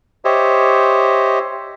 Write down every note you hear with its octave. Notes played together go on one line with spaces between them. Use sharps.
G4 C5 C#5 D#5 E5